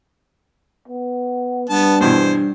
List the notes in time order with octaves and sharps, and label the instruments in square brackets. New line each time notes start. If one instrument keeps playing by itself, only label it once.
[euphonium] B3
[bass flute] G3 [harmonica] B3 A5 [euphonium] D4
[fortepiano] G2 B2 E3 [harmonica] C5